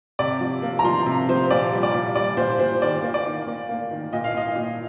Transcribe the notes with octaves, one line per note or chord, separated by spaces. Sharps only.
C3 D5
F3
A#3
A#5
F3 C6
C3
F3 C5
A#2 D5
G3
D5
A#2
G3 D5
A#2 C5
A#2 C5
D#3 D5
A#3
D5
D#3
A#3
A#3
D#3
A#2 D#5
F5
A#2 D#5
A#2